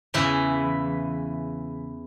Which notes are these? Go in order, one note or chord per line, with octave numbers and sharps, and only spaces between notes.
E2 C#3 E3 E4